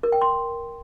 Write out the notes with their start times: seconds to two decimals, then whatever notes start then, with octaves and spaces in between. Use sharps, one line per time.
0.03 A#4
0.12 G5
0.21 C6